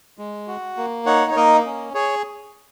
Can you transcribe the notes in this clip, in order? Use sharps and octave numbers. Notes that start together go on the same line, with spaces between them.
G#3
F#4
A#3
D#4 C#5 F#5
C#5
A#3 A#4 D#5
C#4
G#4 C#5